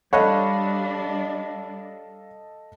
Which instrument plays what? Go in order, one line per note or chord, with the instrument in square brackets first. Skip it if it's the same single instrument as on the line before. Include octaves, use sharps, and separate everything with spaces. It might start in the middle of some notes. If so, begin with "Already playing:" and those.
[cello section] G3 D4 [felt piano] A4 D#5 [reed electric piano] C#5 B5 [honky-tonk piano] F5 F#6